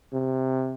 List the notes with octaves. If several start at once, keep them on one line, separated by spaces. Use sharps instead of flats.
C3